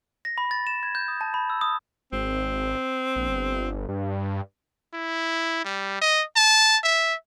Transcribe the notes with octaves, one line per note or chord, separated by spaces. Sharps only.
A#6
B5
A6
E7
G#6
G6
D#6
A5
B5
E6
D#6
G#1 C4
A#1
G1
G2
E4
G3
D#5
A5
E5